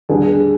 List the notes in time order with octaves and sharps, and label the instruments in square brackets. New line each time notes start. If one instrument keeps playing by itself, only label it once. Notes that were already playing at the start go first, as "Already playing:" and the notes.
[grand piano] D#2 D3 G3 D4 [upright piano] G#4